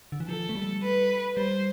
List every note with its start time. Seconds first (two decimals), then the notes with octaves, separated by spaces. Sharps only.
0.12 D3
0.20 E3
0.29 F3 A4
0.49 A3
0.55 G3
0.83 B4
1.37 G3 C5